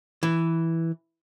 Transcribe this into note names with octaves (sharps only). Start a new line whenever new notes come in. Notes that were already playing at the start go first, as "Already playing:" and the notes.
E3